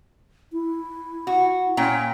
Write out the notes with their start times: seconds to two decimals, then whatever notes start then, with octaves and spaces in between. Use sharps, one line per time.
0.53 E4
1.27 F#4
1.77 A#2 C#4 G5